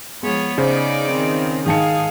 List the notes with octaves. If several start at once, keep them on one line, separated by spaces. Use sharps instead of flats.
F3 G#3 B3 C#5
C#3 D#4 C5 D5
D#3 C4
G#2 D#3 D#4 G#4 F5 A5 C#7